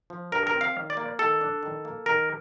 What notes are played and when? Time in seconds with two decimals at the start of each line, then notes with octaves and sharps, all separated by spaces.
0.10 F3
0.32 G2 A#4
0.47 A#4
0.54 C4
0.61 F5
0.76 D#3
0.90 D5
0.97 A#3
1.19 D#3 A4
1.41 D4
1.63 D#3
1.85 A#3
2.06 D#3 A#4